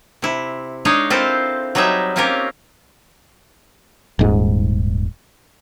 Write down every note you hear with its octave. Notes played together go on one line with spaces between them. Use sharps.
C3 E4
G#3 D4 D#4 C#5 D#5 F5
C4 E4 F4 A4 A#4 C5
F#3 G3 D#4 G#4 E5
A#3 C4 C#4 F4 G4 A#4
D#1 G#2